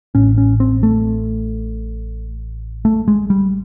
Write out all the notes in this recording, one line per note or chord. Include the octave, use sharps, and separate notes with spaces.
A1 A2 C#4
C#4
C4
A3
A3
G#3
G3